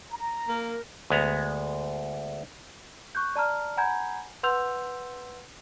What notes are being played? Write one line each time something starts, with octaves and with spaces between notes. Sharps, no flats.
A#5
A#3 A#4
D2 G#3 B3 A#5
C#6 F#6 G6
D5 A5 A#5 F6
F#5 G#5 A#5 B5 G6 G#6
B4 F#5 C6 E6 G6 F7